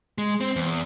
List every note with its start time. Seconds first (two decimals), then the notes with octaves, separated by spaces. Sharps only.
0.18 G#3
0.41 C4
0.56 E2